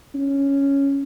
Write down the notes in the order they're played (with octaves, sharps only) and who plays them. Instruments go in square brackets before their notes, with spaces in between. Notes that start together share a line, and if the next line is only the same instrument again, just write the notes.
[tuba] C#4